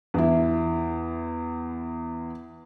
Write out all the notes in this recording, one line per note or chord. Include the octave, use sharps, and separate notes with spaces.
E2 E4